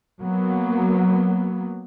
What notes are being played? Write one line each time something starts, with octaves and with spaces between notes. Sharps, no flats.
F#3 A#3 B3